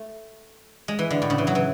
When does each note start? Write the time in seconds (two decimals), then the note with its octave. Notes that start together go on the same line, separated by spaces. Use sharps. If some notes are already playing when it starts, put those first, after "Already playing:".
Already playing: A3
0.88 G#3
0.99 E3
1.11 D3
1.22 A2
1.30 C#3
1.38 E3
1.47 F#3
1.55 E3